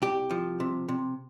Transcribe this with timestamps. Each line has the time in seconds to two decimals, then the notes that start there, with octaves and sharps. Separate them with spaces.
0.02 C2 G4
0.31 F3
0.60 C3
0.89 C3